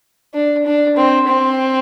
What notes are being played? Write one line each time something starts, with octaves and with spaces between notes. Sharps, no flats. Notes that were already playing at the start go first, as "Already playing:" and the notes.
D4
D4
C4
C4